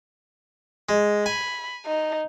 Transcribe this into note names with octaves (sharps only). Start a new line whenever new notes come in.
G#3
G#5 B5
D#4